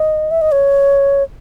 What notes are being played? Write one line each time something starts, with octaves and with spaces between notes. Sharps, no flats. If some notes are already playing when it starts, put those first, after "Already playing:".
Already playing: D#5
E5
D#5
C#5